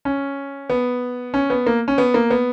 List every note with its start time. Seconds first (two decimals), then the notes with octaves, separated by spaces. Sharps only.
0.05 C#4
0.70 B3
1.34 C#4
1.50 B3
1.67 A#3
1.88 C#4
1.98 B3
2.14 A#3
2.30 B3